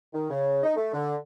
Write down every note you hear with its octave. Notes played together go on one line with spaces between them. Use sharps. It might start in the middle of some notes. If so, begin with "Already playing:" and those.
D#3
C#3
D#4
A3
D3